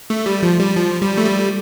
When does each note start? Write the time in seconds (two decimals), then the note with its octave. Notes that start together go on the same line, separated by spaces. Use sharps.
0.10 A3
0.26 G3
0.43 F3
0.59 G3
0.76 F3
1.02 G3
1.18 A3
1.25 G3